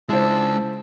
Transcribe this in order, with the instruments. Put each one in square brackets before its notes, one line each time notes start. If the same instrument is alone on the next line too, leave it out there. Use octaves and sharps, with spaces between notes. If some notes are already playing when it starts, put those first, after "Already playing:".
[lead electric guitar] C#2 G#3 [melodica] D4 A5 E6 [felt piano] E4 C5